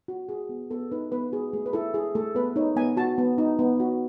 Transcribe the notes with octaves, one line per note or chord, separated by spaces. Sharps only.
F#4
F#4 G#4
B3
B3 A4
D#4 B4
B3 B4
F#4 G#4
A3 G#4
B4
E4 A4
E4 G#4
A3 A4
B3 B4
D#4 C#5
B3 G#5
F#4 A5
B3
D#4
B3
F#4